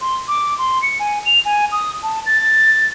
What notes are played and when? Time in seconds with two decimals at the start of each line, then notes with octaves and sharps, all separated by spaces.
0.01 C6
0.28 D6
0.58 C6
0.82 C#7
1.00 G#5
1.26 F7
1.45 G#5
1.72 D#6
2.03 A5
2.26 A6